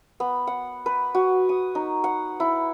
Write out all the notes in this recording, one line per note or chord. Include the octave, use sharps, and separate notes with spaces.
B3
F#5
B4
F#4
D#6
D#4
F#5
E4